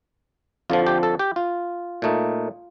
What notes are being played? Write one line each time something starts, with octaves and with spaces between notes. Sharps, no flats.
F2 D3 F3 F4
G4
A4
G4
F4
A#2 A3 D#4